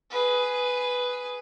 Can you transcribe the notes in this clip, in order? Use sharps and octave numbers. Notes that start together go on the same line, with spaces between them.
G#4 B4